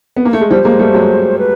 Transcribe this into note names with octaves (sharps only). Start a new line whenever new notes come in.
B3
A#3
A3
G#3
F3 G3 C5
G#3 A#3
G3 A3
F#3 G#3
B4